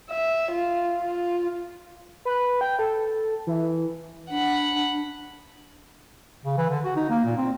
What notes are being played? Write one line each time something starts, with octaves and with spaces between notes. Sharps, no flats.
E5
F4
F4
B4
G5
A4
E3
D4 F#5 B5
C#3
E3
D3
F#4
D#4
A#3
A#2
C4